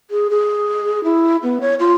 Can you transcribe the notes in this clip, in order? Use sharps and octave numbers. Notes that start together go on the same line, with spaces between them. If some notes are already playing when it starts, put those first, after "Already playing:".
G#4
G#4
E4
B3
C#5
F4